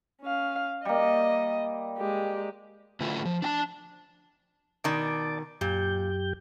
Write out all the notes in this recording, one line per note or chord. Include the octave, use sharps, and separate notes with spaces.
C#4 F5
G3 A#3 D#5
G#3 G4
D3 A3 C#4 E4 F4 G4
F3
D4 G5 A5
B2 D#3 D5 A5 D6
F#2 A#2 G4 G6